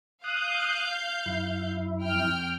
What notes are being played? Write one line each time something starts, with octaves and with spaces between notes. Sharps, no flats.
F5 D#6 F#6 G6
F#2 E4
F2 G5 F6